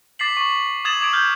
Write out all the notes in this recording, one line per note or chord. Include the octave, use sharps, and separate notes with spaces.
D6 A6 B6 C7 F#7
C#6 B6 F#7
D6 D#6 G#6 A6 E7 F#7
D6 D#6 G#6 D7
F6 G6